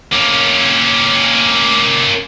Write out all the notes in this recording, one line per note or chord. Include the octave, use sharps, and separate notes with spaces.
A#3 C#4